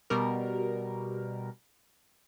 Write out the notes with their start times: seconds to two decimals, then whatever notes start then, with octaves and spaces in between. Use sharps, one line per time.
0.10 B2 G3 A#4